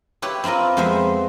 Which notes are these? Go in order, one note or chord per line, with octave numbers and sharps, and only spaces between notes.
E4 G4 B4 C#5
C4 E4 F4 A#4 D#5
F2 G#3 B3 C5 E5